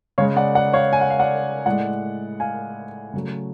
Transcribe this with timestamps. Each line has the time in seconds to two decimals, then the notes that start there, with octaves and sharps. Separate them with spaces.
0.18 C#3 G#3 C#5 F5
0.36 D5 F#5
0.55 D5 F#5
0.73 C#5 F5
0.93 G#5
1.01 F#5
1.10 F5
1.19 D5 F#5
1.66 A2 G#3 D5 F#5
2.40 F5 G#5
3.14 C#3 F#3 A3